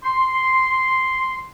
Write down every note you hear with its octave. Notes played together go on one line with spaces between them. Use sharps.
C6